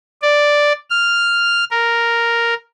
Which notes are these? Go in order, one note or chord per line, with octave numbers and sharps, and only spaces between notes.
D5
F6
A#4